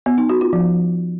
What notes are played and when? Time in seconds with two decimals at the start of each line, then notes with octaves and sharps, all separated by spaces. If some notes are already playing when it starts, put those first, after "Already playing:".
0.06 B3
0.18 D#4
0.29 F#4
0.41 F4
0.53 F3